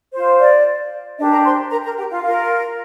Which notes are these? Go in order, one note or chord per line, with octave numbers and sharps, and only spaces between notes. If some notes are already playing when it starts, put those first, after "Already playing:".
F4 C5
D5
D4 G4 A#4 D#5
A#4 A#5
C5 C6
A#4 A#5
A#4 A#5
G4 G5
F4 F5
F4 A#4